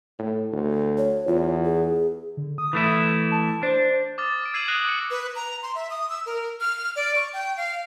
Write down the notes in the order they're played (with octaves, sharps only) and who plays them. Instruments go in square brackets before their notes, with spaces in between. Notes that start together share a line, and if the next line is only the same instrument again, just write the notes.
[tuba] A2
D2
[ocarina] C#5
[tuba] E2 [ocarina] F4
[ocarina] G#4
[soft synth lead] D3
D#6
[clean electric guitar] E3 A3 E4
[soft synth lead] A5
[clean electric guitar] D4 [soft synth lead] C5
[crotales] D6 D#6 F6 A6
D6 A6 D7
E6 G#6 C7 D#7 E7 F#7
D6 D#6 F#6 A#6 C7 D7
D6 C#7
[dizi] B4
A#5
C6
E5
D#6
E6
A#4
F6
D5
C#6
G5
F5